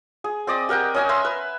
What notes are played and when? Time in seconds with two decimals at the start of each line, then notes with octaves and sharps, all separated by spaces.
0.24 G#4
0.47 C4 D5 D#5
0.69 G4 A#4 F#5 G5
0.94 C#4 D#5 G#5
1.09 E5 A#5 C6
1.25 B4